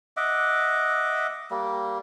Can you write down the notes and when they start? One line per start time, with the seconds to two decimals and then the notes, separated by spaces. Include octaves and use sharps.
0.17 D#5 E5 F#5 D6
1.51 G3 A#3